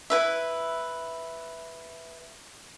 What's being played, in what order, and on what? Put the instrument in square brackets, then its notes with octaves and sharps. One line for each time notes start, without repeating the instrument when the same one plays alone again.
[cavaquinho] E4 B4 E5